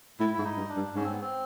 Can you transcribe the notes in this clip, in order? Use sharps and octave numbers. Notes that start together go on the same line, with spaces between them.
A2 E4
G#2 E4
D#4
G2
D4
G2
G#2 C#4
C4
B3
C4